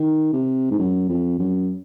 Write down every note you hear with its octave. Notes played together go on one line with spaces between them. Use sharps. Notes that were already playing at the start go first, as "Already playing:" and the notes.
Already playing: D#3
C3
G#2
F#2
F2
F#2